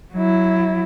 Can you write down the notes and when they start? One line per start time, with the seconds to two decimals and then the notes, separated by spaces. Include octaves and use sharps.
0.14 F#3 E4